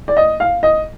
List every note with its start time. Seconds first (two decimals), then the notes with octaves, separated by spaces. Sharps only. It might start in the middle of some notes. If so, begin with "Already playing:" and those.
0.08 D5
0.17 D#5
0.40 F5
0.63 D#5